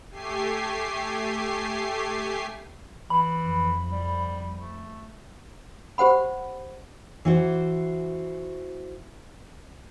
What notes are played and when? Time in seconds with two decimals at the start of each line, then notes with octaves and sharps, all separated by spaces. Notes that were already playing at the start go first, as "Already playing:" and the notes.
0.11 A3 G4 G#5 C7
3.10 E3 B5
3.40 F2
3.91 G3
4.59 A3
5.98 G4 C5 F#5 B5
7.25 E3 F#4 C5